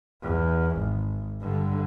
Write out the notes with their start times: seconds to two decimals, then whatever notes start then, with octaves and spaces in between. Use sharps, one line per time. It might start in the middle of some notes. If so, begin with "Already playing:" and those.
0.23 E2
0.78 G#1
1.41 G2 D3